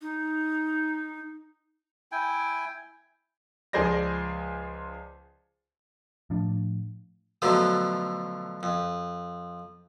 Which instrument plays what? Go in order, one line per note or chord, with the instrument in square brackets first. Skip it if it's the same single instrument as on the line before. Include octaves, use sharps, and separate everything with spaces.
[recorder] D#4
[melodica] E4 G5 G#5
[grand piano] C#2 F3 G#4 C5 D5 A#6
[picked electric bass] A2 F3 D4
[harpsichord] B2 D3 F3 F#3 A3
F2